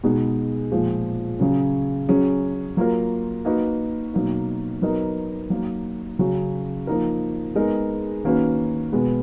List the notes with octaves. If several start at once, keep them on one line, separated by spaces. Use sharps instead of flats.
B2 G#3 D#4 G#4
A#2 F3 G#3
C#3 F#3 C#4
F#3 C#4 G#4
F#3 A#3 F4 A#4
A#3 D#4 F#4 B4 D#5
B2 F#3 A#3 D#4
F#3 B3 D#4 A#4 D#5
F#3 A#3 D#4
C#3 F#3 C#4 F#4
F3 A#3 D#4 A#4
G#3 B3 D#4 A#4 D#5
D#3 A#3 C#4 F#4 B4
B2 G#3 B3